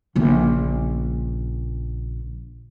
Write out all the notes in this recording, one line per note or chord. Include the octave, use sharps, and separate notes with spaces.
A#1 C#3